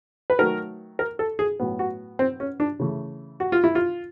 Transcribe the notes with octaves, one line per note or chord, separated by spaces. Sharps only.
B4
D#3 F#3 A3 A#4
A#4
A4
G#4
A2 F#3 B3
F#4
C4
C#4
D4
C#3 E3 A3
F#4
F4
E4
F4